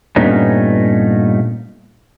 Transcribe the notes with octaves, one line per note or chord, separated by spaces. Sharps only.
G2 A#2 A3 B3 C#4 D#4